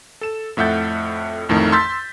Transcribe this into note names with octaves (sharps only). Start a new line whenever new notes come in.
A4 E7
F2 A2 E5 F#5 G6 A6
A1 F2 A2 D#3
C6 E6 G6 A6 B6